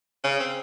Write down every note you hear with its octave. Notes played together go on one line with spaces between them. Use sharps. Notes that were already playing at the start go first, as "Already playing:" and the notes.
C#3
C4